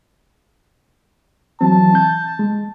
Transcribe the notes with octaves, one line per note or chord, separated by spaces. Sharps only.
E3 F#3 C4 A5
G6
G#3